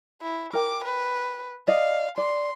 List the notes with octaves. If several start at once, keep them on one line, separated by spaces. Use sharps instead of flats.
E4
A#4 G5 D6
B4
D5 D#5 F5
D5 C6